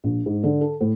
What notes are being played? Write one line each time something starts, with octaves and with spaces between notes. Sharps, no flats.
A#1
G#2
D3
A4
A2